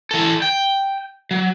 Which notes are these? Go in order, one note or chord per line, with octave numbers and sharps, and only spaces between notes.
E3 A4
G5
F#3